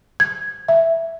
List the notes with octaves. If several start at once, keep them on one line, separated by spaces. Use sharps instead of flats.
G#6
E5